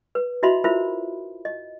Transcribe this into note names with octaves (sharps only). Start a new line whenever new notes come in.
B4
E4 F#4 D#5 E5 B5 C6
E4 F4 A#4 C5 E5 B5
D#5